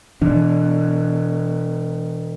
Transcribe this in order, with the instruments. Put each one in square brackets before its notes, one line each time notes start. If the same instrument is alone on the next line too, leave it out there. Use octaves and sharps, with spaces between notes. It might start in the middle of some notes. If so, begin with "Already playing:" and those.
[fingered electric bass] B2 E3 D4